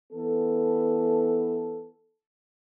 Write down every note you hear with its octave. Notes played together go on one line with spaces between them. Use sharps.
E3 B3 A4